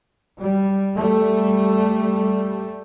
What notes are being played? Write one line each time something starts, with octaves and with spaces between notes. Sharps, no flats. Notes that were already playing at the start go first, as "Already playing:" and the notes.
G3
G3 A3